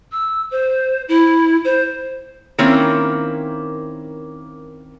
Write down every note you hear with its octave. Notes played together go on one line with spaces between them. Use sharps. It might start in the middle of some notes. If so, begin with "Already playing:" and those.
E6
C5
E4
C5
D#3 A#3 C4 C#4 E4